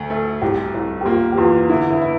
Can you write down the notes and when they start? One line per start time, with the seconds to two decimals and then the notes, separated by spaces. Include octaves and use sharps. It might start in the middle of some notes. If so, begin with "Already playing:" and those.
Already playing: D2 A3
0.10 A3
0.42 C2 G4
0.74 C2
1.01 G4
1.05 A#3 F4
1.32 G4
1.37 E2 F4
1.69 D3 E4
1.90 E4
2.02 E4